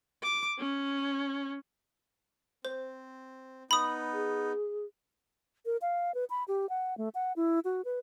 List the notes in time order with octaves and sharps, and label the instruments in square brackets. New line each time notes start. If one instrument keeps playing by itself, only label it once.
[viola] D6
C#4
[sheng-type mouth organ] C4 [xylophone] C5
[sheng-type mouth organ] B3 D#4 [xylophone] B5 D#6
[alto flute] G#4
A#4
F5
B4
B5
G4
F#5
A3
F#5
E4
F#4
B4